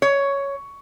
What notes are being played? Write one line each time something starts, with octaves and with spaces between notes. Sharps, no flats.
C#5